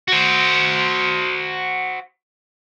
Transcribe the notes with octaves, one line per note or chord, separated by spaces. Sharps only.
F#4 C5